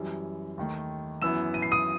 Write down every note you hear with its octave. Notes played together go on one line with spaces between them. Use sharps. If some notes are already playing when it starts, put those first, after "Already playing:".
Already playing: F#2 E3 G3
D#2 D#3 A3
F#2 E3 B3 E4 E6 E7
D#7
C7
D#6 D#7